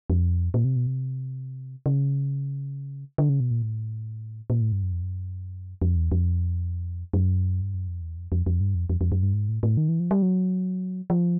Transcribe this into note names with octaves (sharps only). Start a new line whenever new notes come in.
F2
A#2
C3
B2
C3
C#3
D3
C#3
B2
A#2
A2
A#2
A2
G2
F#2
F2
F#2
F2
E2
F2
F#2
G2
F#2
F2
E2
F2
F2
F2
G2
F2
F2
F2
F#2
G2
G#2
A2
A2
D#3
E3
F3
G3
F#3
F3